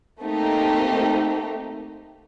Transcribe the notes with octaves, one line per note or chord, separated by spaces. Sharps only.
A3 A#3 C4 D#4 G4